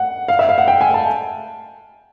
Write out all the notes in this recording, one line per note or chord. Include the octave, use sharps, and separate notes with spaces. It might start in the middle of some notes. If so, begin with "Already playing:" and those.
Already playing: F#5
F5
E5
F5
F#5
G5
G#5
A5